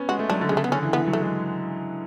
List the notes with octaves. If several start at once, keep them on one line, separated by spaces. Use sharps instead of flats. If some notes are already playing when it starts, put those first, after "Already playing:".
Already playing: B3 C#4
G#3 F#4
A3
F#3 D4
D3
C#3 G#3
A3
B3
D3 C#4
E3
E3 B3
F#3
A3
G#3